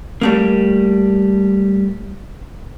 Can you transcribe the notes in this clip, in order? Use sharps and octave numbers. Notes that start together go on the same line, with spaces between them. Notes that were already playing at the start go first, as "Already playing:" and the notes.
G3 A3 A#3